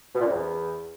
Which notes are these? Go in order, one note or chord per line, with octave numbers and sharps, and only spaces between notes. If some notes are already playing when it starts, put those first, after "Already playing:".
B2
A#2
F#2
F2
E2